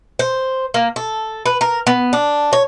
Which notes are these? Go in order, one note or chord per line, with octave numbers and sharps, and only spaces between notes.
C5
A#3
A4
B4
A#4
B3
D4
C#5